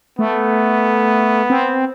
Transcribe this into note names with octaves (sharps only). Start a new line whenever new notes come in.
A3 B3
C4